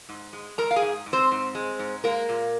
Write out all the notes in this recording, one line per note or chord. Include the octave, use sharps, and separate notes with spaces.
G#2
G#3
G#3 A#4 A#5
F5
G#4 G#5
G#2
G#2
C4 C5
G#2
G#3
G#2
G#3 A#3 A#4
A#2